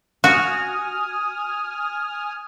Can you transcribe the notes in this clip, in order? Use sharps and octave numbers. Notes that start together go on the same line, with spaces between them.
F#4 G#5 D#6 F6